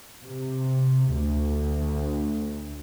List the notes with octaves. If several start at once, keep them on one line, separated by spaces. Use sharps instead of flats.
C3
D2